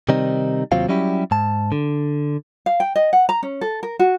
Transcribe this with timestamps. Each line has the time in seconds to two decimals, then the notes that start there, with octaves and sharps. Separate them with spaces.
0.09 C3 D#3 G3 C4 D#4
0.72 D#2 C3 F#3 C4 F4 F5
0.89 F#3 G3 C#4 E4 G4
1.31 G#2 A5
1.72 D3
2.66 F5
2.80 G5
2.96 D#5
3.13 F#5
3.29 A#5
3.43 C#4
3.61 A4
3.83 A#4
3.99 F#4